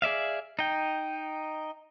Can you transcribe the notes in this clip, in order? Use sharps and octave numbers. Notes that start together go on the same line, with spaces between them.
G#4 D5 E5 F5
D#4 G5